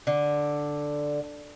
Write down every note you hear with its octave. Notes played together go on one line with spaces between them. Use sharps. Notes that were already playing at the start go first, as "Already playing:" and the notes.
D3